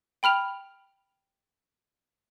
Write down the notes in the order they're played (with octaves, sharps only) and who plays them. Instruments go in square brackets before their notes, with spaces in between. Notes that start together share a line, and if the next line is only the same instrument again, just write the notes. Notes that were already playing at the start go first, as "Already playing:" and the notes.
[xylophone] G5 B5 F6 F7